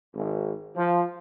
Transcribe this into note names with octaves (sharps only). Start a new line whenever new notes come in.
G#1
F3